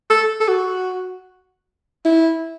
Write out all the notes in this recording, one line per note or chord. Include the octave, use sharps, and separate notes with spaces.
A4
A4
F#4
E4